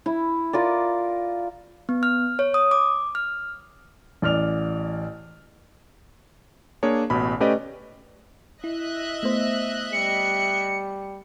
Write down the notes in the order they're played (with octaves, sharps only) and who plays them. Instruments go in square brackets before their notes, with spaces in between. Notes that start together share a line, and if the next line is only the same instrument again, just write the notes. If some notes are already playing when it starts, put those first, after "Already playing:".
[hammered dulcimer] E4
F4 A#4 D5
[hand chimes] B3
F6
C#5
D#6
D6
F6
[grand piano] A1 D5 F6 F7
[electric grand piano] A#3 D4 G#4 C#5
A1 B2 B5
A3 C#4 G4 B4 D5 D#5
[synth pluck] E4 [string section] D#5 E5 F#6
[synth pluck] A3 B3 C5
[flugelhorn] G3 [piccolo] C#7